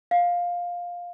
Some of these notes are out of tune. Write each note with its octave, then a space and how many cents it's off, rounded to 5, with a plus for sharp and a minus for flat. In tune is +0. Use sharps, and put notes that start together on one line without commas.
F5 +10